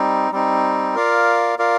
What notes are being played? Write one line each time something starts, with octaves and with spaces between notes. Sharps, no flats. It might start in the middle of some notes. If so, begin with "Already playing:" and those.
Already playing: G3 C4 D#4
G3 C4 D#4
F4 A#4 D5 F5
F4 A#4 D5 F5